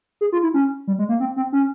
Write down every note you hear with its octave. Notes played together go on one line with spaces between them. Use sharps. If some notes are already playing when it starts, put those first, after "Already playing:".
G#4
F4
E4
C#4
G3
G#3
A#3
C4
C4
C#4